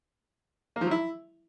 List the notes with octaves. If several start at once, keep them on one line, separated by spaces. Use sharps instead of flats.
A#3
F3
F#3
E4